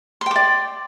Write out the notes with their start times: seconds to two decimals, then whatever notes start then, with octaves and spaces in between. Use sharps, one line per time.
0.21 C6
0.26 G5
0.31 D6
0.36 D5